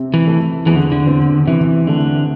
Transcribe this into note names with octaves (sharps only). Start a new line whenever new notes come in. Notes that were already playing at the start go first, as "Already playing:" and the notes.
Already playing: C3 C4
E3
A3
E2 E3
D3
D3
C4
C3 E3
D3 A3